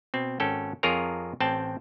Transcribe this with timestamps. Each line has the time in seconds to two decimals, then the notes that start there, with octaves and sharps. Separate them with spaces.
0.14 B2 C4
0.40 G#1 C#4 A4 G5
0.83 F2 F4 G#4 A#4 C#5 A#5
1.40 A1 C4 G5 A5